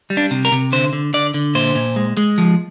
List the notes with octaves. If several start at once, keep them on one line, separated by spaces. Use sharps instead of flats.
G3
D4
C3
A#4
C3
D3 C5
D3
D3 D5
D3
A#2 C5
A#2
G#3
G#3
F3